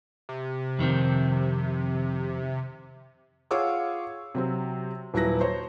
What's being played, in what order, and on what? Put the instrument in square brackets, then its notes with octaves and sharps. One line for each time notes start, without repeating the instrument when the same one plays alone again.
[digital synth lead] C3
[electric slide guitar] F2 D#3 C4
[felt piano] F4 G#4 C#5 F#5 D6 E6
C3 F#3 C4
D#1 F#3 E4 B4 A#6
C5 C#5